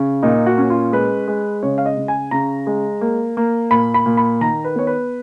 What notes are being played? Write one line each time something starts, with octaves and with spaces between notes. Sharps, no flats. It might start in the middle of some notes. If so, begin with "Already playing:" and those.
Already playing: C#3
A#2 D#4
F#4
C#4
F4
G#3 B4
G#3
C#3 C#5
F5
D#5
C#3
G#5
C#3 A#5
G#3
A#3
A#3
A#2 B5
B5
A#2
B5
D#3 A#5
B4
B3 C#5
B4